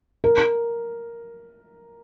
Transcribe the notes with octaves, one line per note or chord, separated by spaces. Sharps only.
A#4